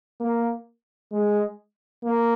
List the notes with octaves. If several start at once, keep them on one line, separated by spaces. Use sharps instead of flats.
A#3
G#3
A#3